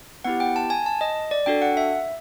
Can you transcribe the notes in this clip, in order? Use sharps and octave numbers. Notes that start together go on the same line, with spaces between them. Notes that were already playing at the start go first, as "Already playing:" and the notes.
B3 E4 G4 F#5
G5
A5
G#5
A5
D#5
D5
D4 F#4 A4 G5
F#5
E5